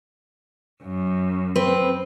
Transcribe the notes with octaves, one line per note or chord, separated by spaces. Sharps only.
F#2
C4 B4